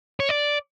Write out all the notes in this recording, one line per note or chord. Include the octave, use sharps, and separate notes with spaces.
C#5
D5